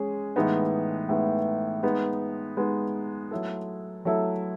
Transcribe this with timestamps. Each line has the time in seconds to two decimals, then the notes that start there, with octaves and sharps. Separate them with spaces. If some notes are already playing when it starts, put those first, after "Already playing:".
Already playing: G#3 C#4 G#4
0.36 A2 E3 G#3 B3 D#4
1.09 A2 E3 G#3 B3 D#4
1.83 G#3 B3 D#4
2.57 G#3 B3 D#4
3.31 F#3 A3 E4 A4
4.05 F#3 A3 E4 A4